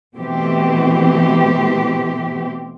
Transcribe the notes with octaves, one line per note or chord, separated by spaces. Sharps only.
B2 E3 A3 C4 G4